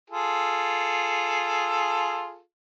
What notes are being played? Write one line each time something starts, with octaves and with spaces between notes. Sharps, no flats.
F4 G#4 A4